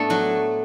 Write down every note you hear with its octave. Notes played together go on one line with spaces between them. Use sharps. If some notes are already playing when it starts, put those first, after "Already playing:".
Already playing: A2 A3 B3 D4 A4 D5
F#3 F#4